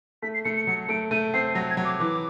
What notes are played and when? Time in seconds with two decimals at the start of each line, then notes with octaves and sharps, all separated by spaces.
0.22 A3 B6
0.34 C7
0.45 A3 C#7
0.57 C#7
0.67 F#3 C#7
0.89 A3 D7
1.11 A3 D#7
1.34 C4 C7
1.55 F#3 A#6
1.70 G#6
1.77 F#3
1.85 D6
2.00 E3 D6